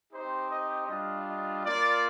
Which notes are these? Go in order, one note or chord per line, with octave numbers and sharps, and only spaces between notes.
C4 D#4 G4 C5
D#5
G3 D4 F4 D#5
D#5
A#3 F4 D5